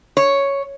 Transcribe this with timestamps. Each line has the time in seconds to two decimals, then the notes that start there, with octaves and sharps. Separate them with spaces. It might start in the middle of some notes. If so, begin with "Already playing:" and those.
0.17 C#5